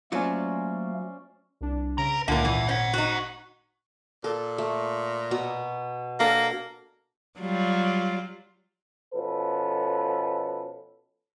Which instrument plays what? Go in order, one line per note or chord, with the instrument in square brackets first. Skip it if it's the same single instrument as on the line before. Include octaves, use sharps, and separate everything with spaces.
[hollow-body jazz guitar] F#3 F4 F#4 [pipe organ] A3 A#3 [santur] C#4 C5 D5
[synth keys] C2 D4
[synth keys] C#3 D7 [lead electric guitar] B4 A#5
[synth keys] C#2 A#2 A#3 [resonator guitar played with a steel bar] D3 A#4 [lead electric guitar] E5 F#5
[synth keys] G#1 A#2 [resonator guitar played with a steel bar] E3
[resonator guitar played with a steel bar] C#4 [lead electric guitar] C5 F#5
[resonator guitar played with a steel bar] D#4 F#4
[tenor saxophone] A#2 [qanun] A4
[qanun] A3
B2 A#5
[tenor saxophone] A#3 [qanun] D4 A4
[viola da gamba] F#3 G3 F4
[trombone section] B2 F3 C#4 A4 B4